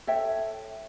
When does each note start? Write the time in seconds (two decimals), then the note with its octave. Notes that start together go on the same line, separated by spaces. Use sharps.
0.07 A4 C#5 E5 G5